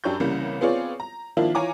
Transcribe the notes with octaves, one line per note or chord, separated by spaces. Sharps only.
F#2 D4 G4 C#6 G6
C2 C#3 E3 G3 A#3
B3 C4 F4 G#4 C#5 D5
A#5
D#3 F3 A#3 D4 E4 F4
E3 F4 C#5 G#5 A#5 D6